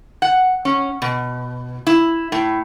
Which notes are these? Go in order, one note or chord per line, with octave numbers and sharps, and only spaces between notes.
F#5
C#4
B2
E4
A2